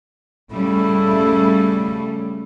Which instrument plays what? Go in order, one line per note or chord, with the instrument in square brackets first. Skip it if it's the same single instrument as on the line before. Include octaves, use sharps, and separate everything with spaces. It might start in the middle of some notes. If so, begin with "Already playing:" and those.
[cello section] C#3 G3 [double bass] A3 E4